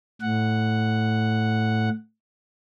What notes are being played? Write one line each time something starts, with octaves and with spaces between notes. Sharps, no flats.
A2 F#5